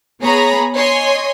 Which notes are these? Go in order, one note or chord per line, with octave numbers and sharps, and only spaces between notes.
B3 G#4 C#5 A#5 B5
C#5 D#5 G#5 C6